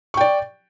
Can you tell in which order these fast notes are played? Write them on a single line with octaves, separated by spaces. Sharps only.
C#6 G5 D5